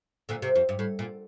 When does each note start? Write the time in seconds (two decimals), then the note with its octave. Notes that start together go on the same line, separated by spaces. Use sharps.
0.29 A#2 D3
0.42 C3
0.56 F2
0.69 G2
0.79 A2
0.99 A#2